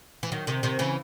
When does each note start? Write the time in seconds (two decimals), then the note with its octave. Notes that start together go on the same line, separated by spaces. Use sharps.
0.23 E3
0.32 D#3 F#3
0.47 C3 D#3
0.63 C3 D#3
0.79 C#3 E3